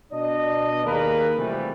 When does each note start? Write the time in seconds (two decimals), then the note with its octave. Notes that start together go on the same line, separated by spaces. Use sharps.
0.12 B2 D4 D5 D#5
0.85 D#2 A#3 G#4 A#4 B4
1.38 C3 E3 F3 G3 A3